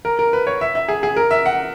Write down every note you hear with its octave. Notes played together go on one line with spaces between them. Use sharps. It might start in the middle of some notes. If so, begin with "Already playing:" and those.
A#4
A#4
B4
C#5
E5
E5
G#4
G#4
A#4
E5
F#5